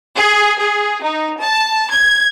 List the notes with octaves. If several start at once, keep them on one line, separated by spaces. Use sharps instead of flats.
G#4
G#4
D#4
A5
G#6